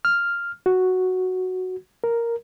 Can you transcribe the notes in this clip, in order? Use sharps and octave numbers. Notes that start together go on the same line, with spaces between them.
F6
F#4
A#4